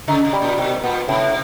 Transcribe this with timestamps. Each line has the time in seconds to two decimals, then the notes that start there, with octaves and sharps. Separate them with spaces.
0.08 C#3 D#4
0.25 C3
0.33 G3
0.42 A#2
0.58 B2 D#3
0.84 A#2 B3
1.08 A2 C3